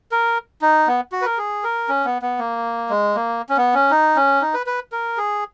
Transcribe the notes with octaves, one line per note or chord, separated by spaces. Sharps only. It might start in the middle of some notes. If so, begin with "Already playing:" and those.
A#4
D#4
B3
F#4
B4
A#4
G#4
A#4
C#4
B3
B3
A#3
G#3
A#3
C#4
B3
C#4
D#4
C#4
D#4
B4
B4
A#4
G#4